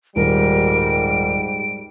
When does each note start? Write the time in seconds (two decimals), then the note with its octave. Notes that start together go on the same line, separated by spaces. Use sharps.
0.16 D#1 G#2 G3 A#4 D7